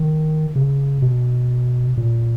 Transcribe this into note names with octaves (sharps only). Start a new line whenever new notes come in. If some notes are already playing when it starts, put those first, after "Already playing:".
Already playing: D#3
C#3
B2
A#2